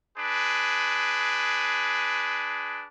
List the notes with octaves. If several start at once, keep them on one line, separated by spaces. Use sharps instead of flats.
D4 G#4 B4